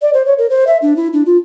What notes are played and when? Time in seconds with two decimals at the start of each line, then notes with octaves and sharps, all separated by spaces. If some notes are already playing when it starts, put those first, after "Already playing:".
0.02 D5
0.14 C5
0.26 C#5
0.38 A#4
0.50 C5
0.67 E5
0.82 D4
0.97 E4
1.13 D4
1.26 F4